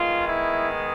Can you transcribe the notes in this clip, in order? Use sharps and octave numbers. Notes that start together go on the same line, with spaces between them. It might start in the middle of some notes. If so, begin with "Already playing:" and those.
Already playing: D#3 G#3 B3 F4
E4